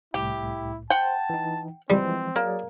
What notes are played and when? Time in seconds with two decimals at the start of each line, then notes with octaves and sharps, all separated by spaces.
0.14 C2 A2 E4 G4
0.90 C5 F#5 G5 A5
1.30 E3 D#4
1.90 E3 F3 G3 G#3 C4
2.36 F#3 A#3 G#4 D5